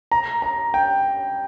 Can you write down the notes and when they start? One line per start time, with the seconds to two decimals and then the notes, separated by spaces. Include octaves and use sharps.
0.12 A#5
0.42 A#5
0.74 G5